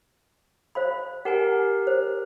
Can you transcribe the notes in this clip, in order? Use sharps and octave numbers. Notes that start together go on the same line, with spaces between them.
C5 F5 B5
G4 A#4 F#5 G#5
C5